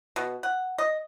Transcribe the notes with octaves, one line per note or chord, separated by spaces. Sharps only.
B2
F#5
D#5